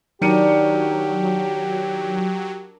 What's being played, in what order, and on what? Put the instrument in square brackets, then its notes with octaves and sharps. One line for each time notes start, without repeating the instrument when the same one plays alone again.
[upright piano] D#3 C#7 D#7 [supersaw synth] F#3 [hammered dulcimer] D4 A#4 D5 [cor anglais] G4